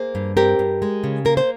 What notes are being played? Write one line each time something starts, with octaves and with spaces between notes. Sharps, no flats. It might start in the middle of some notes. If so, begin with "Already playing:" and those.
Already playing: A#3 G#4 C5
G2
C4 G4 A#4
G2
G#3
C#3
A#3 A#4
C5